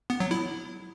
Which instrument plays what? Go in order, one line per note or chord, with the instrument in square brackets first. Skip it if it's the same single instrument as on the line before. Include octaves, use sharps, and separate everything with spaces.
[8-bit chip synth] B3
F#3
E4